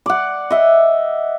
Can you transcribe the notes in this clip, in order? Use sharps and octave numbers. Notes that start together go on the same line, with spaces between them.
D5 F#5
D#5 E5